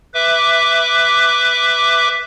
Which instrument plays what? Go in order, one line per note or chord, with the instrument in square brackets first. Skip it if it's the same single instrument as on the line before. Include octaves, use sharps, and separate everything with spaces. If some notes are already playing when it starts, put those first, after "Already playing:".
[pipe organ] B4 E5 D6